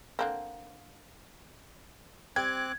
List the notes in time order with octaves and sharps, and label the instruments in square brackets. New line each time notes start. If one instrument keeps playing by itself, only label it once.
[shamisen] D3 A#3 C4
[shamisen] G3 G5 [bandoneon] C4 D6 F#6 [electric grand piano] G#6